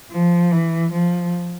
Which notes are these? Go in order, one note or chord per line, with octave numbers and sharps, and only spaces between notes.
F3
E3
F3